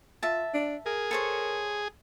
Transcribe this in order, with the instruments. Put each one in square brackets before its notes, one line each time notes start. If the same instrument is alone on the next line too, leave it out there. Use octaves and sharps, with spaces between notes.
[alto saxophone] F4 [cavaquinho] E5 A5
[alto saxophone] D4
[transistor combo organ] G#4 [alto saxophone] A#4
[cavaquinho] A4 C5 C#5